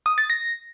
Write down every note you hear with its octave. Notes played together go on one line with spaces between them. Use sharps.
D#6
A6
A#6